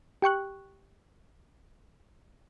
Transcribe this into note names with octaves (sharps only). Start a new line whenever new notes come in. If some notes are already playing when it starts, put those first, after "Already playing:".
G4 G5 C#6 F#6